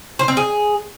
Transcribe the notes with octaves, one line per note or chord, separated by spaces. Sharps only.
C5
C4
G#4